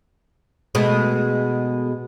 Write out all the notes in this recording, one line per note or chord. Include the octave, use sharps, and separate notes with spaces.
B2 G#3 A3